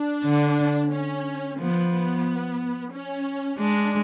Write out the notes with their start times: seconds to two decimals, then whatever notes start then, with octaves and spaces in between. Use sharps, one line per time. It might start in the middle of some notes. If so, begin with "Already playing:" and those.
Already playing: D4
0.24 D3
0.91 C#4
1.59 F3 B3
1.92 B3
2.92 C#4
3.59 G#3 D4